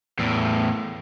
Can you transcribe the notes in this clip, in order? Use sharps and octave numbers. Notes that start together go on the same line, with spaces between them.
E2 A2